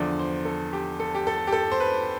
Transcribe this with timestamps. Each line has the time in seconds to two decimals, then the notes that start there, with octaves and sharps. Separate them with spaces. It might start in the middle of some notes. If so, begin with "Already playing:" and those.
Already playing: E2 D3 F3 D5
0.19 C5
0.45 A4
0.73 G4
1.00 A4
1.15 G4
1.27 A4
1.47 G4
1.52 A4
1.72 C5
1.80 B4